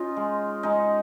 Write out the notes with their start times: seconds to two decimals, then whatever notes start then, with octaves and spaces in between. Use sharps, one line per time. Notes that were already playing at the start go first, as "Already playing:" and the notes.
Already playing: C#4 D#4 F4
0.17 G#3
0.63 G#3 D#4